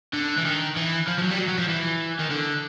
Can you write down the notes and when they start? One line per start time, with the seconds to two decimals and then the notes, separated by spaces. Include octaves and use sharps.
0.14 D3
0.38 E3
0.45 D#3
0.76 E3
1.07 F3
1.18 F3
1.22 F#3
1.31 G3
1.38 F#3
1.48 F#3
1.58 F3
1.69 E3
2.19 D#3
2.31 D3